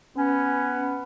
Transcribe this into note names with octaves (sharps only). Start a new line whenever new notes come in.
B3 C#4